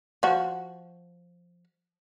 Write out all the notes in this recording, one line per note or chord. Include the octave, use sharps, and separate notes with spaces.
F3 F#4